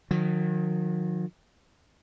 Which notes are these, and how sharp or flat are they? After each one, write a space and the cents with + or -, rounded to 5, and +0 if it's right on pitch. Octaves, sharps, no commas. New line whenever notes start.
D#3 -20 F#3 -45